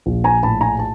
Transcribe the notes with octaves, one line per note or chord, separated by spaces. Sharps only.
A#1
G#5 A#5
A2 A5 B5
G#5 A#5
A5